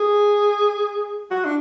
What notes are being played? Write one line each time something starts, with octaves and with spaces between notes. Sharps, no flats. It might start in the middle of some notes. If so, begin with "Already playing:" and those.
Already playing: G#4
F#4
D4